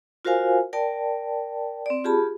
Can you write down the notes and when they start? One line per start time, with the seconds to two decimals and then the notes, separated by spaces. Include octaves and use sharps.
0.25 F4 F#4 A#4 C5 F5 G#5
0.73 A#4 D5 G5 A5
1.86 C4 D5
2.04 F4 G4 G#4 A5 B5